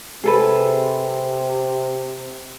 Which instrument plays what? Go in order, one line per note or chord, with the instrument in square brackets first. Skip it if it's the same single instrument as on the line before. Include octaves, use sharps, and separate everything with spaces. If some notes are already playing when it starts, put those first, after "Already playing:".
[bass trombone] C3 [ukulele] G#4 A4 B4